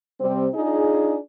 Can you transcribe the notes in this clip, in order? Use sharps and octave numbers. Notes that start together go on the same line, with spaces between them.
C3 G3 C4
D4 D#4 F4 G#4